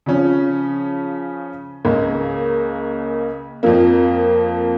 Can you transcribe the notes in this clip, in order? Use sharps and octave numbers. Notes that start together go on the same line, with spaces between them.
C#3 F3 C#4
C#2 C#3 A#3
F2 F3 A#3